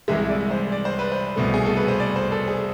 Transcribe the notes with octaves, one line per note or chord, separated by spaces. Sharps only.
C2 C3 E3 G#3 E5
D5
C5
D5
C5
B4
C5
C2 B2 A3
G#4
A4
B4
C5
D5
C5
A4
G#4